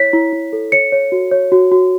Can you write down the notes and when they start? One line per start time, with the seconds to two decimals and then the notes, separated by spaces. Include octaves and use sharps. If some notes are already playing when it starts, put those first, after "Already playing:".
Already playing: E4 C#5 B6
0.13 E4
0.33 E4
0.53 A4
0.72 C#5 C#7
0.92 C#5
1.12 F#4
1.31 C#5
1.52 F#4
1.72 F#4